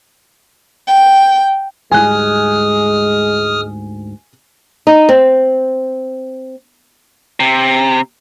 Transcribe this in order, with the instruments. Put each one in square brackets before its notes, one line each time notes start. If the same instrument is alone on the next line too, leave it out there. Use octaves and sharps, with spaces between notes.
[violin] G5
[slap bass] D2 G#2 G3 [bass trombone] G#3 [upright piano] G#5 F#6 [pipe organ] D#6 F6
[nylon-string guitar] D#4
C4
[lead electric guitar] C3